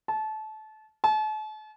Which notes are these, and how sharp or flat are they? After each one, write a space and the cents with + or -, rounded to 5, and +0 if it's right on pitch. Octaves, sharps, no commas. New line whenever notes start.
A5 -25
A5 -40